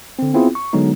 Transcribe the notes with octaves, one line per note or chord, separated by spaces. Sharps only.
D3 C4
B3 C4 E4 F4 G#4
C#6
D3 F#3 G#3 B3 D#4